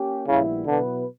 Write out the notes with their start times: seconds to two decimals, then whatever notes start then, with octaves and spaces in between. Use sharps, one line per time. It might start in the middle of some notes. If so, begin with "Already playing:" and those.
Already playing: A#3 C#4 G4
0.27 A#1 A#2 C#3 G3 B3 E4
0.66 B2 D3 F#3 B3 E4 B4